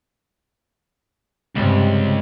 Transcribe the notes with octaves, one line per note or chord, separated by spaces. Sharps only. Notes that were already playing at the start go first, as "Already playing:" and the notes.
C#2 G2 C3